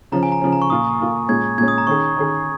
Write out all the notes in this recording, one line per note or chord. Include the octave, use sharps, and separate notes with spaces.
C#3 F3 C#4 A#5
G#5
A#5
C#3 F3 C#4
A#5
C#6
A#2 A#3 F4 D#6
A#2 A#3 F4
A#2 G#3 C#4 G#6
A#2 G#3 C#4 G#6
D#6
A#5
D#3 C#4 G#4 C#6
D#3 C#4 G#4